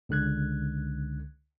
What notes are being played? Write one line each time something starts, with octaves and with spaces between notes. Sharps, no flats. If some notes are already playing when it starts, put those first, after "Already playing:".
C#2 D3 F#6 G#6